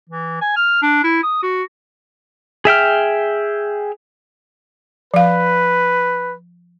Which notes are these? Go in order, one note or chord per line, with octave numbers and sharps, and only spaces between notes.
E3
G#5
F6
D4
E4
D#6
F#4
G#4 E5 G5 F6
F3 B4 F5